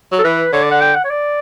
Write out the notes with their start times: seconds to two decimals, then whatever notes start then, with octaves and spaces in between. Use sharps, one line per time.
0.12 F#3
0.19 A4
0.24 E3 B4
0.53 D3 C#5
0.62 D5
0.71 F#5
0.81 G5
0.95 F#5
1.04 C#5
1.10 D5